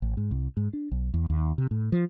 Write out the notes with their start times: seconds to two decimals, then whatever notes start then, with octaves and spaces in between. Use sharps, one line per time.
0.02 A1
0.17 G#2
0.31 C2
0.57 G#2
0.73 D4
0.91 B1
1.14 E2
1.30 D#2
1.58 C3
1.71 A2
1.92 F3